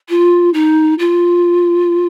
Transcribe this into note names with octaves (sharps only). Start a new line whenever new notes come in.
F4
D#4
F4